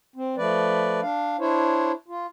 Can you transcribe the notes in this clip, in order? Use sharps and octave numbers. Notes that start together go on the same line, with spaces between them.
C4
F3 A3 B4 D5
D4 F5
D4 E4 C5 C#5
F4